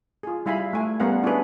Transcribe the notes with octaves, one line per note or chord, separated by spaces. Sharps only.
F4 G#4
G3 E4 F5 G#5 B5
A3 E4 G#5
G3 B3 C#4 A#4 F5 F#5
C#4 D4 E4 F#4 G#4 B4